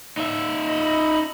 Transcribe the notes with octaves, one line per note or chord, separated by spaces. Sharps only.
D#4 E5
D#5 B5